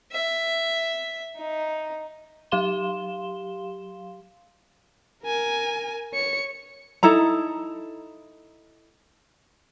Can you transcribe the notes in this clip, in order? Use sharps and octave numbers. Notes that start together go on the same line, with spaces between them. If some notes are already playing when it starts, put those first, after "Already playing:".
E5
D#4
F#3 G4 F5 C6 E7 G7
A#4 G#5
C#5 C#7
D#4 E4 A4 A#5